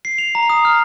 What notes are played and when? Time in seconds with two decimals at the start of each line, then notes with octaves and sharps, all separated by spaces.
0.05 C7
0.18 F7
0.35 A#5
0.50 D#6
0.65 F6